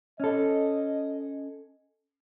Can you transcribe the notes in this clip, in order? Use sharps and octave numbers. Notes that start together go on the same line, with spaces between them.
C#4 A4 D#5